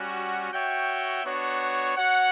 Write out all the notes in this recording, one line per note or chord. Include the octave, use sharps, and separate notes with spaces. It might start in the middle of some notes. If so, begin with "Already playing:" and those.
Already playing: G3 C#4 F#4
F#4 C#5 E5 G5
B3 D4 F#4 C#5
F#4 C#5 F#5